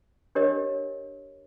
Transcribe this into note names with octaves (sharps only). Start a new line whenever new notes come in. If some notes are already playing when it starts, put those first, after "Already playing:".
D4 G4 A#4 C#5 D#5